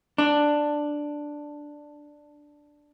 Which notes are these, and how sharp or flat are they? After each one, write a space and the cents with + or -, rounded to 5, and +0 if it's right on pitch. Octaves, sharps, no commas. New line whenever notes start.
D4 +5